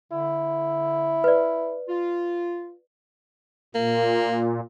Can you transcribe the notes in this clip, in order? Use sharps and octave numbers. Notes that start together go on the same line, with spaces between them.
D3 E4
B4 D5
F4
A#2 A#3